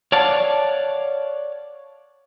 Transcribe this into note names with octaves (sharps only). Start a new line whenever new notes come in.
C#5 D5 F5 F#5 A5